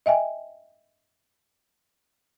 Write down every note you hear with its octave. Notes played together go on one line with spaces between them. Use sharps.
D#5 E5 G5 G#5